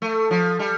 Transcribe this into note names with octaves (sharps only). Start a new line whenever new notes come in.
A3
F3
G3